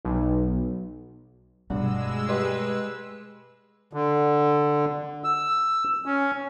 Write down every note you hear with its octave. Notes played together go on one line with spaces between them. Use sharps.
B1
G2 B2 G#3 A3 F#4 E6
G4 B4 D#5 C6
D3
E6
C#4